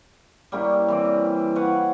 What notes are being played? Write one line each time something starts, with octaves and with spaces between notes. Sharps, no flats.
G3 A#3 C#4 E4
E3 C4 D5
B4 C#5 F5 F#5